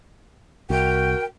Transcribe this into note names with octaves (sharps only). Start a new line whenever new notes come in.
C2 F#4 A#4 G5